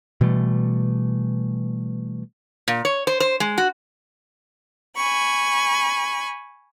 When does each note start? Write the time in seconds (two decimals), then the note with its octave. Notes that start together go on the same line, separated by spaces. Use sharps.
0.21 B2 E3 G3 A3
2.68 A#2
2.85 C#5
3.07 C5
3.20 C5
3.40 G#3
3.58 F#4
4.96 G#5 B5 C#6